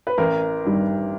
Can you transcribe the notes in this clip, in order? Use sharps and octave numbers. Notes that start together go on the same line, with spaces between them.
B4
A1 A#4
G2 D#3 G3